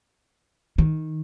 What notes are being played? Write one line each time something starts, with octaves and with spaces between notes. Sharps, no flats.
D#3